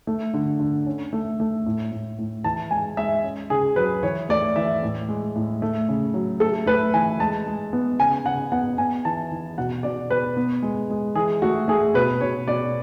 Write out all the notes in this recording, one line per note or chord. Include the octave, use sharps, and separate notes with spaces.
A3
D3
D3
C#4
A3
A3
A2
A2
A2
E3 A5
G#3 G#5
G#3 E5
C#4
C#3 G#4
F#3 B4
E3 C#5
A3 D5
E3 E5
A2
G#3
A2
A3
C#3
F#3
A3 A4
A3 B4
E3 G#5
G#3 A5
G#3
B3
C#3 G#5
C#3 F#5
B3 F#5
B3 G#5
E3 A5
E3
B2 F#5
B2 D5
B2 B4
B3
G#3
G#3
E3 G#4
A3 F#4
A3 G#4
B2 B4
B2 C#5
B2 D5